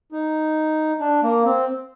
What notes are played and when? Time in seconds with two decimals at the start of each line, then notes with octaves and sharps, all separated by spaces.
0.12 D#4
1.00 D4
1.23 A#3
1.45 C4